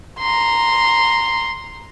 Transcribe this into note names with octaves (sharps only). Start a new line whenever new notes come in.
A#5 C6